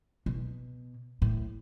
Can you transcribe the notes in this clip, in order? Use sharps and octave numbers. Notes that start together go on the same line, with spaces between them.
B2
A2